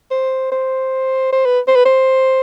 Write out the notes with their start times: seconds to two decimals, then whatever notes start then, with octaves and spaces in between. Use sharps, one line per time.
0.11 C5
0.52 C5
1.32 C5
1.45 B4
1.68 C5
1.76 B4
1.85 C5